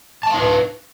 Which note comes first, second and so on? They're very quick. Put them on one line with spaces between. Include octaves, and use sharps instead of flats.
A5 E5 F5 D#4 B4